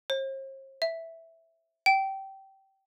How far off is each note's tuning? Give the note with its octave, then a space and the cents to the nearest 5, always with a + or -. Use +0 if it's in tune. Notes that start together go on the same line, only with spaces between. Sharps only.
C5 +45
E5 +0
G5 -20